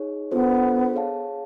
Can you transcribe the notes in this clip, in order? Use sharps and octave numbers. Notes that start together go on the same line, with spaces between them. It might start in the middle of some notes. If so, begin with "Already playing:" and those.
Already playing: D#4 G#4 C#5
B3 D4 F4 A4 C5
G#4 C#5 F5 A5